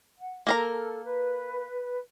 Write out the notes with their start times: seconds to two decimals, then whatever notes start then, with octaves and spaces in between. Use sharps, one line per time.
0.19 F#5
0.47 A#3 A4 A#4 A#5
1.04 B4